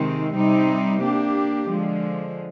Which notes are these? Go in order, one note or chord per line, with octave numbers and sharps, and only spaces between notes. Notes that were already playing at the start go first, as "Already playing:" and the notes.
Already playing: C3 D#3 G#3 C4
C3 G3 C4 D#4
A#3 D4 G4
D3 F3 G#3